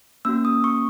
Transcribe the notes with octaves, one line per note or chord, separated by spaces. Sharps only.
A#3 C#4 F#4 E6
D#6
C#6